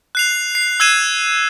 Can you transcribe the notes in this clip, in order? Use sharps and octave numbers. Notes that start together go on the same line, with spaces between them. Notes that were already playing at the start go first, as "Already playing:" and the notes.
F#6 C7 F7
C7
E6 F#6 G#6 C7 D#7 E7